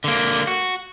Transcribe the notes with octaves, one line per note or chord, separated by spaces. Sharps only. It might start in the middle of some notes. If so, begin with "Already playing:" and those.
D3 A#3
F#4